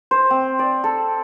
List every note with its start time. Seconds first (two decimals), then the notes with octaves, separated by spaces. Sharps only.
0.11 C5
0.30 C4
0.59 D5
0.84 A4